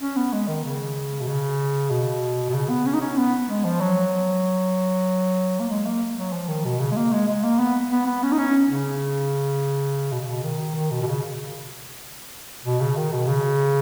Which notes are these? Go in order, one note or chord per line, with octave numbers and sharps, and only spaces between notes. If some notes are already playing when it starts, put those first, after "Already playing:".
C#4
B3
G#3
D#3
C#3
B2
C#3
B2
B2
C#3
B3
C#4
D#4
C#4
B3
G#3
F3
F#3
A#3
G#3
A#3
F#3
F3
D#3
B2
C#3
G#3
A#3
G#3
G#3
A#3
B3
B3
B3
C#4
D#4
C#4
C#3
B2
C#3
B2
D#3
D#3
B2
B2
C#3
B2
C#3
D#3
B2
C#3